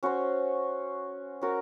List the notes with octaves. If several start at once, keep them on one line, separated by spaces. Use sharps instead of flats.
C#4 F#4 C5
C#4 F#4 A#4